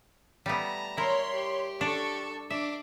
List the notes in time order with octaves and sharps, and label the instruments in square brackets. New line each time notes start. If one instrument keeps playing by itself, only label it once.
[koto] G3 A3 B3 [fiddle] A5 A#5
[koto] E4 A#4 [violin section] C#5 B5 C6
[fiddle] G4
[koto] D4 [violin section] A4 A5 C#6
[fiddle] D4 [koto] E5 [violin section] D6